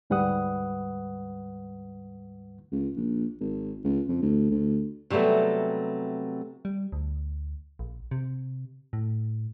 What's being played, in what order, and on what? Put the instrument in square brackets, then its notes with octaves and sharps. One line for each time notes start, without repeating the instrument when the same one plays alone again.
[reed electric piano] D2 G#2 G3 B4 F#5 D#6
[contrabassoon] C#2
A#1
G#1
C#2
F2
D2
D2
[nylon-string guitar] C3 F#3 G3 A3 B3
[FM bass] G3
D2
A#1
C3
A2